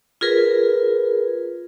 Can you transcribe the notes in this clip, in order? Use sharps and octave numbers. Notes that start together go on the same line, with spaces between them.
F4 G#4 A#4 B4